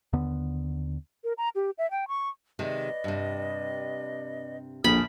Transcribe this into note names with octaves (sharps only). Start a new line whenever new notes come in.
D#2 D3 B3
A#4
A#5
G4
E5
G5
C#6
C3 D#3 G#3 B4 D5 D#5
G2 C3
A#1 E2 A2 D3 G#5 B5 D#6 F6